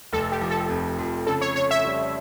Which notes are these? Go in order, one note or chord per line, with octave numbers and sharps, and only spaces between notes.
F1 A4
G4
F3
A4
F2
F2
C#3 A4
C#5
C#3 C#5
E5
G3